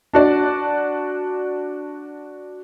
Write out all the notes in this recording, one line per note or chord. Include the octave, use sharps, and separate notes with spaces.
D4 F#4 D5